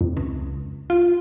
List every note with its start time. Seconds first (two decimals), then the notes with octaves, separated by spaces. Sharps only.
0.01 F2
0.17 C#2
0.90 F4